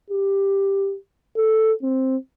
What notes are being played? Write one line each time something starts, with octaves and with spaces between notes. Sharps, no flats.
G4
A4
C4